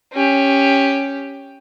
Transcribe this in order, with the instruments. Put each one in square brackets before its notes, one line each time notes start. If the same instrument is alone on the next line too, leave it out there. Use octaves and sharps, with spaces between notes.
[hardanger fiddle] C#4 G4